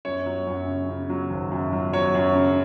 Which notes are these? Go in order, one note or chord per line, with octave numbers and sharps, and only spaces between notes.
F#2 C#5
F#3
F#2
C#3
C#3
F#3
G#1
F#2
F#3
F#3 C#5
F#2
C#3